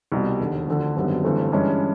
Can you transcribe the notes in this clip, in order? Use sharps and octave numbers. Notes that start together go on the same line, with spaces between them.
C2 B2 G3
E1 D#2 D3
D2 D3 F3
G#1 F#2 D3 G3 B3
G1 G2 E3 A3 C4
G2 E3 G#3 C#4